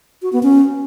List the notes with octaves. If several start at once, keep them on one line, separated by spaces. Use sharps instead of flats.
F#4
B3
C#4